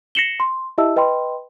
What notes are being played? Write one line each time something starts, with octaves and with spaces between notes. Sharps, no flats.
A#6 C7 C#7 E7 F#7 G7
C6
E4 G4 D#5 E5 A5 E6
B4 D#5 G5 B5 C6